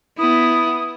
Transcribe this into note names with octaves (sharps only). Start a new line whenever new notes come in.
B3 E4 D#6